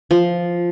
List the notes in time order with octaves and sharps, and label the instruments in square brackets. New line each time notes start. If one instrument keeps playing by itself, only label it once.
[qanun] F3